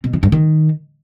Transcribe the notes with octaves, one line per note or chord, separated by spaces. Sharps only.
B2
E3
G2
D#3